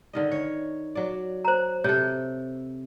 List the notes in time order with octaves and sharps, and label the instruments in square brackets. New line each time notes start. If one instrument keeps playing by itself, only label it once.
[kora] D3 D#3 D#5
C#5
F#3 D5
[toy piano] C5 A#5
[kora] C3 A4 [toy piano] C#5